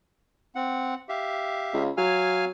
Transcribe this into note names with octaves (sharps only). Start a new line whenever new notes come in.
C4 F#5
G4 E5 F5
C#2
F#3 F5 G#5 F6